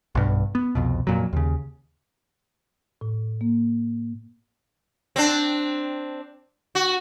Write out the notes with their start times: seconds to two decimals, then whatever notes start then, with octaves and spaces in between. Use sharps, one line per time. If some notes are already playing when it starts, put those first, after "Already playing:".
0.15 B1 G2
0.55 B3
0.75 C2 F2 B2
1.07 F2 A#2 F#3
1.33 D#2 C#3
3.01 A2
3.41 A#3
5.16 C4 D4
6.75 F#4